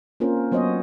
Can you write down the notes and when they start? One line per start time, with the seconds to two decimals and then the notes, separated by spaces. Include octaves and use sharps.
0.20 A#3 C4 C#4 F4 A#4 C5
0.52 F#3 B3 C5 C#5 D#5